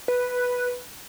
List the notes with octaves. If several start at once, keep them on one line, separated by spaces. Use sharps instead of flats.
B4